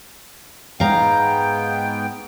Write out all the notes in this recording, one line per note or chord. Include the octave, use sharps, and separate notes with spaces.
G#2 B3 F5 G5 A#5